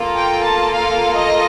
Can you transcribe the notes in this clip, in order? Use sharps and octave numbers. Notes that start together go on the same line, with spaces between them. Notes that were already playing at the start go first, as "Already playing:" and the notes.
Already playing: A#3 F4 A4
G5
A5
F5
D#5